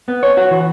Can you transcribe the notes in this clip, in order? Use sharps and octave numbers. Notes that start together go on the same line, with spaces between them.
B3
C#5
F#4
E3